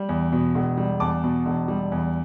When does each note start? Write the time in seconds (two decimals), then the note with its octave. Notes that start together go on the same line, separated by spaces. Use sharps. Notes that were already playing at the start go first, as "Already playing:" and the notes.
Already playing: G3
0.09 E2
0.32 B2
0.55 E1
0.77 G3
1.00 E2 A5 D6
1.24 B2
1.46 E1
1.68 G3
1.92 E2